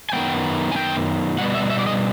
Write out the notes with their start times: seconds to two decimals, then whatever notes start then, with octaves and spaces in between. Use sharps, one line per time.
0.10 G#5
0.13 F#2 D#3 G3 B3 G5
0.72 G#5
0.76 G5
1.38 B2 G3 B3 F#5
1.55 E5
1.70 E5
1.79 D5
1.86 D#5